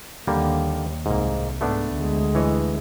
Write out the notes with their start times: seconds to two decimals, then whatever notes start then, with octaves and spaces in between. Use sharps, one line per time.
0.27 D#2 D3 G3 A#3
1.06 C2 G#2 A#3
1.61 G#2 A3 B3 D4
1.94 D2 G#3
2.35 E3 C#5 D#5